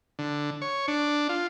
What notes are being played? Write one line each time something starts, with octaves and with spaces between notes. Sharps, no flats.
D3
C#5
D4
F4